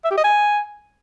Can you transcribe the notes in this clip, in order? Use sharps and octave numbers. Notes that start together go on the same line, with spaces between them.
E5
G4
D#5
G#5